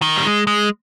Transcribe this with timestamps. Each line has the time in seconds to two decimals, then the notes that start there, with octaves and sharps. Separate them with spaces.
0.02 D#3
0.16 G3
0.25 G#3
0.47 G#3